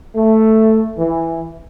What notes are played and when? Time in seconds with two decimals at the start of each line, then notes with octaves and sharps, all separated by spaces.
0.14 A3
0.97 E3